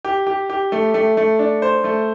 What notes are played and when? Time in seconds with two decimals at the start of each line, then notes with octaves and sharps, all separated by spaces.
0.05 G4
0.27 G4
0.50 G4
0.72 A3
0.94 A3
1.17 A3
1.39 D4
1.62 C5
1.84 A3